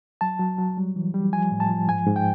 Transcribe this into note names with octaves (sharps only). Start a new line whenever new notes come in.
F#3 A5
F#3
F#3
G3
E3
G3
F3 G#5
A2
A5
F3
G#2 G#5
G#2
G5